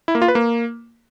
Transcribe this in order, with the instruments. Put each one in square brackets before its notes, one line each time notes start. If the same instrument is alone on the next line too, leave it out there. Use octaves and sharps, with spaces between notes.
[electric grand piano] E4
A#3
F4
B4
A#3